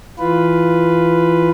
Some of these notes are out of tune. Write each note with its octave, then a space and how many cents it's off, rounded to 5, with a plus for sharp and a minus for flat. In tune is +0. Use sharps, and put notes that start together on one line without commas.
E3 +0 F4 +0 B4 +0